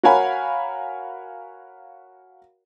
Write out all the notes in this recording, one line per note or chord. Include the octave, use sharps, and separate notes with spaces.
F#4 A#4 C#5 F5 G#5 B5